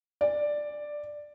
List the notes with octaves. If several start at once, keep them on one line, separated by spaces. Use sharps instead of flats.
D5